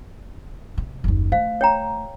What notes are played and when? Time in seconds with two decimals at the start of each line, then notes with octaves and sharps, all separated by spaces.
0.78 C3
1.04 F#1 D#2
1.32 A3 C5 F5
1.61 C#5 G5 A#5